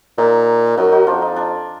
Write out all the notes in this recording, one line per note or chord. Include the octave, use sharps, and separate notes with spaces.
A#2 D#4
F#2 D#4 F#4
D#4 F#4
F2 D4 F4
D#4
D4